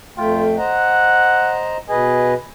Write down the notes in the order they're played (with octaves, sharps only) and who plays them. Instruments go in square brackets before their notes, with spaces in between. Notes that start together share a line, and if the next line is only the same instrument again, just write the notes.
[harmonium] F2 A3 G5 [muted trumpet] F4
[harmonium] C5 D#5 A#5 [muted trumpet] F#5
[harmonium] B2 B4 D#5 [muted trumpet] G#4